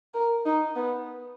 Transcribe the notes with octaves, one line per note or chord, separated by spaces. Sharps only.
A#4
D#4
B3